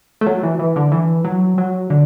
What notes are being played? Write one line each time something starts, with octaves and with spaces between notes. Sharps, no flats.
A3
F#3
E3
E3
D3
E3
F#3
F#3
D3